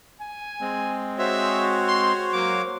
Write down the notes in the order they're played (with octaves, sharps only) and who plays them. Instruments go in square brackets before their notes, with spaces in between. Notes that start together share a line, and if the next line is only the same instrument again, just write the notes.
[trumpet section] G#5
[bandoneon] G#3 C4
[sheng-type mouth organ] F#4 C5 C#5 [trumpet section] G#4 E5
[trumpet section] C6
[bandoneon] F#3 [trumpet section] A#3 D6